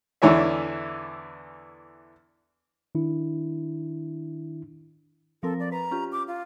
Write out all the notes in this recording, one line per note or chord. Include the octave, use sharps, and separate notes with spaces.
E2 D3 E3 D4 C#5 E5
D#3 D4 E4
F3 C4 A4 A#4
D5
B4 A#5
C#4 F4 G4
D6
F4